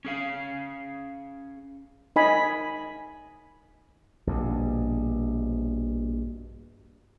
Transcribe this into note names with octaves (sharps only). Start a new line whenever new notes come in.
C#4 G#4 F5
D#4 D#5 G#5 B5
A#1 G2 B2